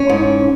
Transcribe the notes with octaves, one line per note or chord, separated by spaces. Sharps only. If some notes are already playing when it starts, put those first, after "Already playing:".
Already playing: C#4
G#2